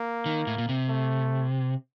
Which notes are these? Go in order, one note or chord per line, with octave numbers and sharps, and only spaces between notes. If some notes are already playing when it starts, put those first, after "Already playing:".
Already playing: A#3
D#3
A2
A#2
C3
A3